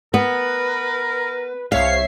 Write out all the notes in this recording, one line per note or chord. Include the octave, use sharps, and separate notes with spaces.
B3 A#4 B4
C2 C#5 E5 F5 C7